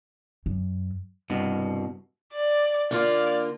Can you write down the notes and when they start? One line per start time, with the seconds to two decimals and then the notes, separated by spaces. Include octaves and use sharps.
0.46 F#2
1.30 C2 G2 B2
2.33 D5
2.91 D3 A#3 F4 D5